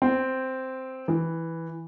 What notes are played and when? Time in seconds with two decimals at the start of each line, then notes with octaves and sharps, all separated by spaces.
0.02 C4
1.08 E3